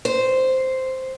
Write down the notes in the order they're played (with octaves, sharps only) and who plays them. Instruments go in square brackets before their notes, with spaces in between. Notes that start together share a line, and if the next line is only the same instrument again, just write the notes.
[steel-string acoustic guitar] C5